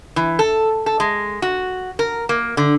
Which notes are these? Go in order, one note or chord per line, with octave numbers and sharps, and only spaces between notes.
E3
A4
A4
G#3
F#4
A#4
A#3
D3